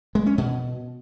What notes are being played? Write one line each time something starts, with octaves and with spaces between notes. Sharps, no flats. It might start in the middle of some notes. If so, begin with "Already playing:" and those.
G#3
C#4
B2